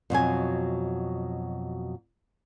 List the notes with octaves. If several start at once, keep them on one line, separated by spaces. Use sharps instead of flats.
F2 B2 F#3 G#5